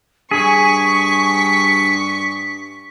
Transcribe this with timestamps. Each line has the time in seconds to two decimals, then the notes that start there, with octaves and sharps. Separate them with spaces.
0.31 G2 G#4 G#5 C#6 B6